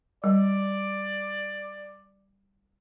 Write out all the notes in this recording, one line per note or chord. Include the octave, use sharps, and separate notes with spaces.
G3 D5